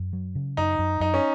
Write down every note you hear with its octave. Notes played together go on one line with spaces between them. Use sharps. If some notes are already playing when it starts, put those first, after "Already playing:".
Already playing: F#2
F#3
C#3
F#2 D#4
F#2
F#2 D#4
C#4